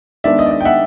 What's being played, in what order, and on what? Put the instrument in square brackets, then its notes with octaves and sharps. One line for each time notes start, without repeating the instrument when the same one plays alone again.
[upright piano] D#3 G#3 B3 D4 D5 E5
D#5
D5
D#5
G5
E5 F#5